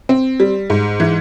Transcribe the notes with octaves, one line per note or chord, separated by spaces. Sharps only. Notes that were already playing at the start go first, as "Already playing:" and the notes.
C4
G3
G#2
E3